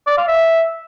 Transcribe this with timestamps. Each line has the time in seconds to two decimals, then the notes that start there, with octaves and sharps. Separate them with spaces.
0.07 D5
0.17 F5
0.28 E5